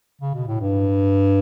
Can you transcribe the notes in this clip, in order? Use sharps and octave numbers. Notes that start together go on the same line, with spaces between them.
C#3
B2
A2
G2